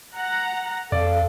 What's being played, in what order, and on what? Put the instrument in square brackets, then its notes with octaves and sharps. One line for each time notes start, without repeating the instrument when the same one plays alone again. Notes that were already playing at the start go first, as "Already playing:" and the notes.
[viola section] F#5 A#5
[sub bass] F2 [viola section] A4 [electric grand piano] D5 [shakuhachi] F5